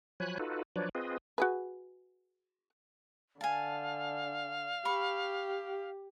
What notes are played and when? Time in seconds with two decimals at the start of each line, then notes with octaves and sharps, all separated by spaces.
0.20 F3 F#3 C#5 G#5 B5 F#6
0.39 D#4 F4 F#4 A4 B4
0.76 F3 F#3 D4 B4 C#5 D5
0.95 C4 F4 G#4 B4 D#5
1.38 F#4 G#4 B4
3.41 D3 F5 G#5 A5
4.85 G4 B5 C#6